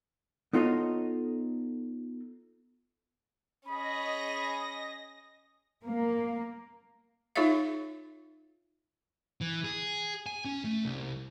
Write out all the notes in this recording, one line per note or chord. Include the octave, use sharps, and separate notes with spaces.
B3 D#4 F4 A4 C#5 D#5
C#4 G#4 D#5 B5 A#6
A#3
D#4 F4 G#4 C#5 E5 F5
E3
G#4
G#5
C#4
A3
C2